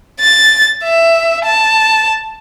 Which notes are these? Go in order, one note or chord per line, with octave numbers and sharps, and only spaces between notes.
A6
E5
A5